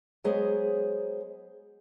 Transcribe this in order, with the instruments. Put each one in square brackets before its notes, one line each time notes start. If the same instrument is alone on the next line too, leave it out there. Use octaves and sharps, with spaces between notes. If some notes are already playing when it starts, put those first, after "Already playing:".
[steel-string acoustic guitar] F#3 G#3 B3 G#4 C5